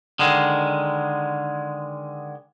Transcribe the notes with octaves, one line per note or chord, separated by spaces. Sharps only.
D3 D#3 G#3